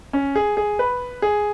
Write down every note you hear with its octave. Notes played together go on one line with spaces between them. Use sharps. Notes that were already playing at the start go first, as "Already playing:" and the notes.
C#4
G#4
G#4
B4
G#4